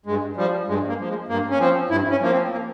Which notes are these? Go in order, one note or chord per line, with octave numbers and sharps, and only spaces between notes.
G2 G#3
F3 G3
G2 G#3
A#3
F3
G#3
G2 A#3
C#4
F3 C4
G2 E4
C#4
F3 A#3
C4
A#3